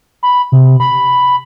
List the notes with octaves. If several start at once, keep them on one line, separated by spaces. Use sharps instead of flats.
B5
C3
B5